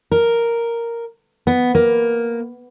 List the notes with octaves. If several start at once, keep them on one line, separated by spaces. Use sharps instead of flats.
A#4
B3
A#3